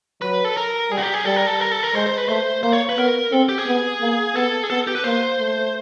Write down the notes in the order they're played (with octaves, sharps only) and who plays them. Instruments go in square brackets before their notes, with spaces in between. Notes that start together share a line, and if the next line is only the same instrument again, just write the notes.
[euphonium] F#3 [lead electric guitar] B4
[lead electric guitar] A4
A#4
[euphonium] G3 [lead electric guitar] G#4
[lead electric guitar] F#4
G4
G#4
[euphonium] G3 [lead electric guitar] A4
[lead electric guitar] A#4
A4
A#4
A4
A#4
[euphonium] G#3 [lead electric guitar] C5
[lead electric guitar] C5
B4
[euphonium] A3 [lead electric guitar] C5
[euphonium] A#3 [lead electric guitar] C5
[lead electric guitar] C#5
B4
[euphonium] B3 [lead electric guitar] A#4
[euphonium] C4 [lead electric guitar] A4
[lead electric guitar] G4
G#4
[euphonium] B3
A#3
[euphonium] B3 [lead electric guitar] A4
[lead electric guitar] G#4
[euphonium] B3 [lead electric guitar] A4
[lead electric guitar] G4
B4
[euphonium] A#3 [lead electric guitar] C5
[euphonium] A3